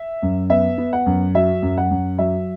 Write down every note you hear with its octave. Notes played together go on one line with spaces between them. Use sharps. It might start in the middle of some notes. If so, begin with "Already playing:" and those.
Already playing: E5
F#2
B3 E5
B3
F#5
F#2
F#3 E5
F#2
F#5
F#2
F#3 E5